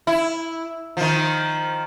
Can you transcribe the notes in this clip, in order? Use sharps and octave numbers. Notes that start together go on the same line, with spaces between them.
E4
D#3 F3